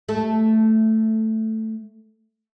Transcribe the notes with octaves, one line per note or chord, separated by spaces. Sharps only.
A3 A4